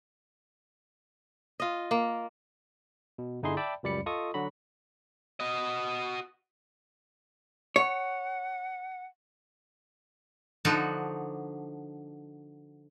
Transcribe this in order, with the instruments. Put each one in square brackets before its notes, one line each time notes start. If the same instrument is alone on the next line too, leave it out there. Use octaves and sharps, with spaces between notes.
[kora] F4 D#5
A#3
[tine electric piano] B2
G1 D3 D#4 E4 G#4 C6
D5 E5 G5 A5 B5
C#2 F#2 G3 D5 B5 C#7
F4 A4 D#5 C#6 D#6
D3 F#3 F#4 B5
[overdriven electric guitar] F#4 D#5
[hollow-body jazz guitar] C#5 [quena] F#5
[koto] D3 F3 D4 D#4 F#4